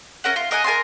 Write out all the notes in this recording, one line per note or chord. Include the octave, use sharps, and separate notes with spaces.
C#4 A#4 F#5
F4
A#4 D#5 F#5 G#5
A#4 G#5 A5 C6